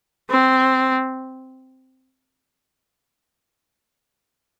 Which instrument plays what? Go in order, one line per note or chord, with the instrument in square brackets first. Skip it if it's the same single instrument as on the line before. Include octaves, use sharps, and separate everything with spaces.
[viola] C4